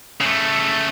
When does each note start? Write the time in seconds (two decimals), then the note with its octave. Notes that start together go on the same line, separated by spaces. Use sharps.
0.21 C#3 A3